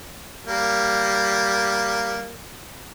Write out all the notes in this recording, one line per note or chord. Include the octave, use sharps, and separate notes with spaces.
G3 A#3